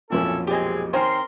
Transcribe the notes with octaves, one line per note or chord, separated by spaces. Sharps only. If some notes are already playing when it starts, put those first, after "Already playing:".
B1 F2 A#2 C#4 E4 A4
G#3 C4 G4 G#4 D#5
D#3 C4 C#4 A#4 C5 C6